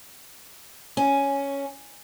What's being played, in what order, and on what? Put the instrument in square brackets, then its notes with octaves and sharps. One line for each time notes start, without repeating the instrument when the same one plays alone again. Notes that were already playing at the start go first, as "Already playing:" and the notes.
[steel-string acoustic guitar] C#4